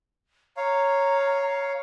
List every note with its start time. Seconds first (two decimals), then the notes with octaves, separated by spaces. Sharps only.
0.57 C#5 F5 A#5